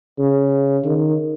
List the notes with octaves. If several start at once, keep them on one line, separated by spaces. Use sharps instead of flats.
C#3
D#3